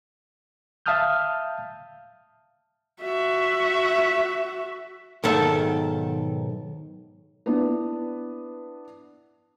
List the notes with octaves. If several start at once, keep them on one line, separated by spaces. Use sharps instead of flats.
E5 F5 A5 D#6 F6 G6
F#4 E5
B1 G#2 D#3 A4 E5
B3 D4 E4 B4